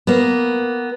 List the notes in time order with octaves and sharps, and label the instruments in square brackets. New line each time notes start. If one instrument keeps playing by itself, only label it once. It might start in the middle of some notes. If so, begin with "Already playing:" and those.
[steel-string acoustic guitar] A#3 B3